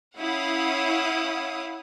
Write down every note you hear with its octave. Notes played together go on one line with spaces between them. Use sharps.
C#4 E4 F5 F#5 D#6